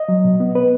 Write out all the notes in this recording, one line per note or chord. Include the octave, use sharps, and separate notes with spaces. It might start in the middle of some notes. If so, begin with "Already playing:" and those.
Already playing: D#5
F#3
B2
B3
B3 B4